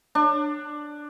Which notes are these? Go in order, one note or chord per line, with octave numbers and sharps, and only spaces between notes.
D4